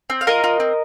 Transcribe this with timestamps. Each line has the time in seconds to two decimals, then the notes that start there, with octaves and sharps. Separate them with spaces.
0.10 C4
0.21 F5
0.27 F4 A#4 D#5
0.44 F4
0.60 C4